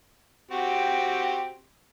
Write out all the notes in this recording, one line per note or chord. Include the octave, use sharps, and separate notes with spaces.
C4 F#4 G4